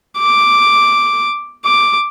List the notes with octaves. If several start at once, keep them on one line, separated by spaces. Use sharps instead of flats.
D6
D6